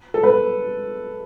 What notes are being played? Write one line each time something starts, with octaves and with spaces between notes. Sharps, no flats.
A4
B4